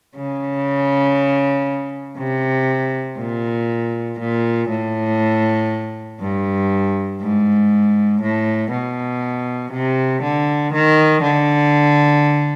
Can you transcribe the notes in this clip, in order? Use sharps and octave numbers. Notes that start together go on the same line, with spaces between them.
C#3
C3
A#2
A#2
A2
G2
G#2
A2
B2
C3
D3
D#3
D3